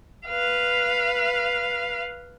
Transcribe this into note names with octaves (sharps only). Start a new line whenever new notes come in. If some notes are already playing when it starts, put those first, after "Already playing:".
B4 F5